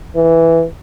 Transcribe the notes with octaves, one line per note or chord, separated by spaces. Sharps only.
E3